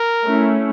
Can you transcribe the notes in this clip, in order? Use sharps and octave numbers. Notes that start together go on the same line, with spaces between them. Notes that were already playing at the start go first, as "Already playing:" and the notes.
Already playing: A#4
A3 C#4 E4